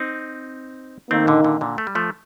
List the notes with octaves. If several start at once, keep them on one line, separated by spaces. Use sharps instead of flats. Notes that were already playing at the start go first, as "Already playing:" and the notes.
Already playing: C4 D#4
D#3 A3 A#3 C4 D#4
A#2 D3
A#2 D3
A#2 D3
A3
G3
F3 A3